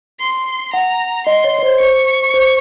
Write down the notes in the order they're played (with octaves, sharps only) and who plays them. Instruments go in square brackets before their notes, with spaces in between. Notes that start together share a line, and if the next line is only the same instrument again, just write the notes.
[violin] C6
[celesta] F#5 [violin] A#5
[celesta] D#5 [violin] C6
[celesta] C#5
C#5
C5
[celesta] C5 [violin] C#6
[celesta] C5